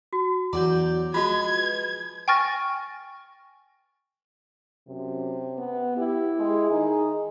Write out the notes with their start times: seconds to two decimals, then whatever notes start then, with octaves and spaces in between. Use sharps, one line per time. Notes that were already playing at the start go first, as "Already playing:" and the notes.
0.13 F#4
0.53 E2 F#3 D5 A#5 G6
1.14 F3 G#3 F4 F#4 B4 B5 G#6
2.28 G5 G#5 C#6 F6 A6 A#6
4.88 F#2 C3
5.58 B3
5.98 E4 G4
6.39 G#3 G#4
6.71 D#3 D#4